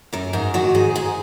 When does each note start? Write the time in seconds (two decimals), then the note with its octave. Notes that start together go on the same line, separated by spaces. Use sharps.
0.13 F#2 A#4
0.33 G#2 A#4
0.54 D#3 F#4
0.75 G#2 G#4
0.95 G#2 G#4